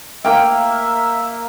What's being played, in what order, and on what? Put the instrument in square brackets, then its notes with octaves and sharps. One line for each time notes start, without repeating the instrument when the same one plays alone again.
[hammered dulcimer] A#3 F5 [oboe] E5 [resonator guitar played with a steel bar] G5